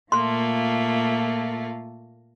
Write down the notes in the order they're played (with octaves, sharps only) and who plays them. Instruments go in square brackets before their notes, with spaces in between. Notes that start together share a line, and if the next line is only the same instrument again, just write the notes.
[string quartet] A#2 A3 F4 [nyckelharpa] A#3 [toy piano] C6